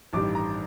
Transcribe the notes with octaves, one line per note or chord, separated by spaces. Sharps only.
A1 G2 D#3 G3 D6
A#5